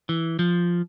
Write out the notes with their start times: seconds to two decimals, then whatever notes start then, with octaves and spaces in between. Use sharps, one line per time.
0.09 E3
0.39 F3